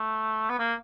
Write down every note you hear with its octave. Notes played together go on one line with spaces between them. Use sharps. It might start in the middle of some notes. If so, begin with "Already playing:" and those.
Already playing: A3
B3
A#3